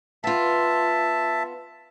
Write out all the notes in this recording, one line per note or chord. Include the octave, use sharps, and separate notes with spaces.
B3 F4 E5 A5